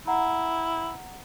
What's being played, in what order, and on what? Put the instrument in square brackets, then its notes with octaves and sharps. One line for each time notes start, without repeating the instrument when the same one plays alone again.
[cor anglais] E4 [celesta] F#5 A#5